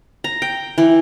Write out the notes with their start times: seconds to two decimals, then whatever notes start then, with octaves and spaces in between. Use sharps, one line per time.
0.24 A#5
0.42 G5
0.78 E3